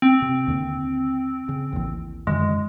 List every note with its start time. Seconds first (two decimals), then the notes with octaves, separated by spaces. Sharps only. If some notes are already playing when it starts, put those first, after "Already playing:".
0.02 C4
0.22 C3
0.47 D#2 D3
1.49 C#3
1.73 A1 D#2
2.27 F#2 D3 D#3 G#3